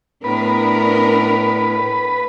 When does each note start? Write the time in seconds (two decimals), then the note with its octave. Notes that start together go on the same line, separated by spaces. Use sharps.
0.24 A2 B3 D4 A#4 B4